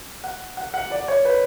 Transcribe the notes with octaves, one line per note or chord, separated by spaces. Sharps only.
F#5
F#5
F#5
D5
C#5
B4